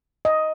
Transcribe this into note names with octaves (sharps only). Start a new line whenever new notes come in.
D#5